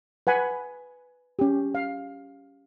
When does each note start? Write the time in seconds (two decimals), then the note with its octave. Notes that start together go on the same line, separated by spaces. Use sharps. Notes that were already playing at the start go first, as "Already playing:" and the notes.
0.27 B4 F#5 G#5 B5
1.39 C#4 G4
1.75 F5